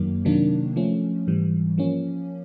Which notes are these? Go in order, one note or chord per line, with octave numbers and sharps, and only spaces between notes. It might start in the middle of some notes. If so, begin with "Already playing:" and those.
Already playing: F#2 D#3 F#3 A#3
C3 D#3 F#3 A#3 D4
F3 A3 C#4
G#2 E3 G3
F3 A#3 C#4